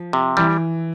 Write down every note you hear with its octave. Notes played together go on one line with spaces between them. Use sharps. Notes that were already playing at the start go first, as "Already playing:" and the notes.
Already playing: F3
C3
E3 G3